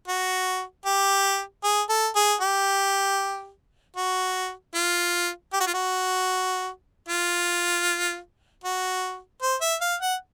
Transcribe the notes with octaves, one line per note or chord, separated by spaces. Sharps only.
F#4
G4
G#4
A4
G#4
G4
F#4
F4
G4
F#4
F4
F#4
F4
F#4
C5
E5
F5
F#5